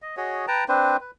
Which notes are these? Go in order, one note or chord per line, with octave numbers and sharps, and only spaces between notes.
D#5
F#4 G#4 C#5 D#5
B4 G5 A5 A#5
C4 D4 B4 C5
B4